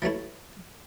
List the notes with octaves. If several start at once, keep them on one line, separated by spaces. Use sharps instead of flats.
E3 F#3 A3 E4